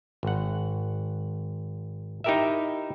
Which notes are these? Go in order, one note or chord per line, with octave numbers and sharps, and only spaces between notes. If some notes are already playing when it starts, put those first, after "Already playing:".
G#1 F#5
D#4 E4 G4 A#4 D#5 E5